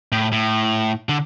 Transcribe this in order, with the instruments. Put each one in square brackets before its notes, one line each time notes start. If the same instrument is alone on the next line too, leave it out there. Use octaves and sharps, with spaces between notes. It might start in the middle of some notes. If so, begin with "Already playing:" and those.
[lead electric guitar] A2
A2
D3